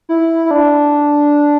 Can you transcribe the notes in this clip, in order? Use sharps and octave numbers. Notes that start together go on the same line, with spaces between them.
E4
E4
D4